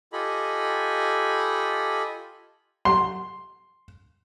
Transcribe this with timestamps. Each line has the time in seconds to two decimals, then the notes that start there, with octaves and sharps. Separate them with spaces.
0.13 F4 G4 A4 D#5 G#5 B5
2.85 C6